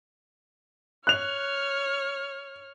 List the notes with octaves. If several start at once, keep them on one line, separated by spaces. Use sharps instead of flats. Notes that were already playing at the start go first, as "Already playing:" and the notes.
C#5 F6 F#6 F7